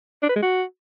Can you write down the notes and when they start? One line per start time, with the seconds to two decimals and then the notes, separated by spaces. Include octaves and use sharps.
0.23 D4
0.29 B4
0.36 G#3
0.42 F#4